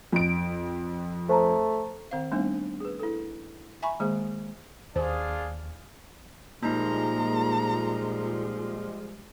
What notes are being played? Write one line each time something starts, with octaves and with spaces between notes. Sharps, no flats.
F2 D7
A3 C5 A5 A#5
D#3 C4 C5 F5
G3 A3 B3 C4 D4 D#4
G#4 B4
E4 A4
E5 G#5 A#5 B5 C#6
D#3 G#3 A#3 G#4 C5
D#2 D4 F4 G#4 C5
A#2 F3 G3 G#3 A#3 D#4 A#5